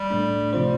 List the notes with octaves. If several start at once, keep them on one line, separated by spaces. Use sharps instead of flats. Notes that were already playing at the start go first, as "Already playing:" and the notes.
Already playing: G3
A2 A3 D4
C3 F3 G3 C4 F4 C5